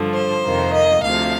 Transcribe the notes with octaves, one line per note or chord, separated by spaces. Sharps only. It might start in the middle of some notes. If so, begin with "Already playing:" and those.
Already playing: G2 D3 F3
C5
F2 C3 D#3 A#3
D#5
D2 C3 F3 F5